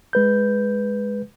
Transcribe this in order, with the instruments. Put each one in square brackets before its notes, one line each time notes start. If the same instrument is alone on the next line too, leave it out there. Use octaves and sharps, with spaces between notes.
[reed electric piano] G#3 B4 G6